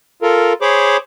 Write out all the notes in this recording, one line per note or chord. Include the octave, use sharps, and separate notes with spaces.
F4 A4 A#4
G#4 C5 C#5 B5 D6